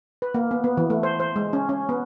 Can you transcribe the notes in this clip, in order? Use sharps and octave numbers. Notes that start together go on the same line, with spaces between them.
B4
A#3
B3
B3
E3
A3
C5
C5
G#3
C#4
C#4
B3